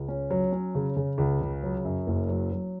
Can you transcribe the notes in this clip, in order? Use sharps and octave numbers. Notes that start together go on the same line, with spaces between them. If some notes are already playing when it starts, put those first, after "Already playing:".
Already playing: C#2
C#4
F#3
C#4
C#3
C#3
C#2
C#3
F#3
F#2
F#1
F#3
F#3